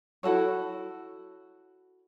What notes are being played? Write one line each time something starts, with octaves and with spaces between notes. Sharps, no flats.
E4 F#4 A4 C#5